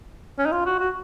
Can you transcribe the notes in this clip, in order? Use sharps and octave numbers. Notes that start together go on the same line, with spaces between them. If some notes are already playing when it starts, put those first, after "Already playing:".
C#4
D#4
F4
F#4
F#4